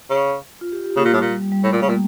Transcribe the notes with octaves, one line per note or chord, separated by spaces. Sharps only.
C#3
F4
G4
G4
C#3 A#3
A#2
A2 G3
A#2
G3
G3
G3
A2 A3
A#2
C#3 A#3
A#2